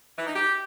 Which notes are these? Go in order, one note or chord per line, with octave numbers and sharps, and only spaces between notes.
E3
D#4
G4